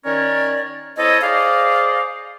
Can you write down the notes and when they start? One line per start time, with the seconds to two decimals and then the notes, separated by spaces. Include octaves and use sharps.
0.05 D#3 C#4 A#4 C#5 D5
0.97 C4 E4 A4 C#5 D#5
1.21 G#4 C5 D5 D#5 F5